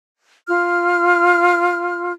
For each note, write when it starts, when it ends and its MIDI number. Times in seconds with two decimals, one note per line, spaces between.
0.48 2.12 65
0.48 2.12 89